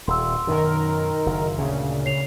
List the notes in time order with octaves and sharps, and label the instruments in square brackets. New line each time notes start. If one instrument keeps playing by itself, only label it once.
[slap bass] D#1 [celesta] C6 E6
[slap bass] F#2 B2 [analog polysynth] D#3 A#4
[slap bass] F#1
[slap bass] D2 A#2 [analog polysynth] C#3
[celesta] C#5 C7 F7